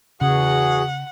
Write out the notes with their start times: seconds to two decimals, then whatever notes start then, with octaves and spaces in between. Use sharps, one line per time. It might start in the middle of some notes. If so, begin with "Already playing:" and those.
0.21 E2 C#3 F#4 G#4 F#5